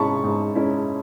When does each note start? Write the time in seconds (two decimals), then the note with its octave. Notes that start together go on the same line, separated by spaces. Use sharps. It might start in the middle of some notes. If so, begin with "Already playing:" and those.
Already playing: G#2 G#3 C#4 E4 A5 B5 C#6
0.24 G#2
0.55 G#3 C#4 E4